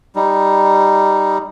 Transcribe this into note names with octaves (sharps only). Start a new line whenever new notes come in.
G3 D#4